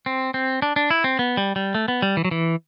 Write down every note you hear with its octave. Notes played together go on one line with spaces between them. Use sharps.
C4
C4
D4
D4
E4
C4
B3
G3
G3
A3
B3
G3
E3
F#3
E3